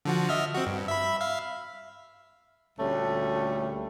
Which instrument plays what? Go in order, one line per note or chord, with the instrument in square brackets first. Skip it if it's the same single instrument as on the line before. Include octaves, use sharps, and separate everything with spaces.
[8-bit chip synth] D3 F3 F#4
D#5 E5 F6
C4 F#4
G2
E5 B5
E5 F5
[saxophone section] D2 A#2 G3 A3 C#4